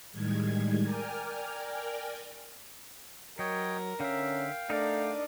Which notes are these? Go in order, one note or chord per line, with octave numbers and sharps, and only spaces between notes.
A2 D#3 G3 G#3 G#6
A#4 D5 G5 G#5 F6
F#3 A#4 C#5 D#5 G5
D3 C#4 E5 F5 G5
A3 D4 D#4 A#4 D5